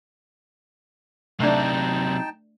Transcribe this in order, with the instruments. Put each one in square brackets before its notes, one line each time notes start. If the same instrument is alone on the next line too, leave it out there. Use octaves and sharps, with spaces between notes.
[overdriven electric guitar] C3 F#3 [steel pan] A3 D4 [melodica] D#4 G5 A5